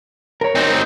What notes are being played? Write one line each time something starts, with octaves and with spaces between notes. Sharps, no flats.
A#4 C#5
C4 D#4